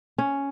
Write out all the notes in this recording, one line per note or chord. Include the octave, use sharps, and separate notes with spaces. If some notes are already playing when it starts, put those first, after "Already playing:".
C#4